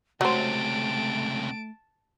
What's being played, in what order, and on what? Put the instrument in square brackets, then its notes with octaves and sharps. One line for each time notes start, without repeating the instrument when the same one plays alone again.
[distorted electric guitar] C#2 C3 [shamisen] F#3 C5 [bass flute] A3 [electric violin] A5 D7